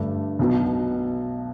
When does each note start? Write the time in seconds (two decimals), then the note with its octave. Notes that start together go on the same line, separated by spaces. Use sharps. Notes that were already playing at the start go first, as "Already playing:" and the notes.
Already playing: G2 D3 A3 D4
0.39 B1 B2 F#3